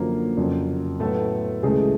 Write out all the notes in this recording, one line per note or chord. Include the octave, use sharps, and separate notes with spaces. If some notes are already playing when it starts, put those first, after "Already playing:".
Already playing: F#2 D3 F3 A#3 A#4
F2 C#3 F#3
A2 F#3 A3 B3 A4
C#2 C#3 E3 G#3 A3 G#4